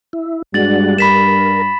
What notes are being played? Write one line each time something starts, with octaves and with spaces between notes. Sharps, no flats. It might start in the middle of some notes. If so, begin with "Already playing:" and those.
E4
G2 G3 G#3 D4 F#4 A6 F#7
A#4 B5 B6 E7